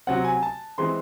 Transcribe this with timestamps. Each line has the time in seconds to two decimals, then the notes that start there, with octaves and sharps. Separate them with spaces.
0.07 C3 F#3 C4 F#5
0.25 G#5
0.42 A5
0.78 E3 G#3 C4 C6